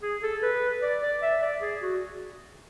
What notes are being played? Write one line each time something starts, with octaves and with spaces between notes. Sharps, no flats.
G#4
A4
B4
D5
D5
E5
D5
G#4
F#4